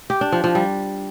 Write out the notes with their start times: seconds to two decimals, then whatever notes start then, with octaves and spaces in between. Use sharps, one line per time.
0.10 G4
0.21 D4
0.32 F3
0.44 F3
0.55 G3